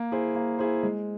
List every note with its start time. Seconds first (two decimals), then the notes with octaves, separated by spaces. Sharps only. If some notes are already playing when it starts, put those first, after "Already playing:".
Already playing: A#3
0.11 E4 G#4 C5
0.35 A#3
0.59 E4 G#4 C5
0.83 G#3